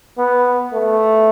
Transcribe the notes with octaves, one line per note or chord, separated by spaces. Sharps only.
B3
A3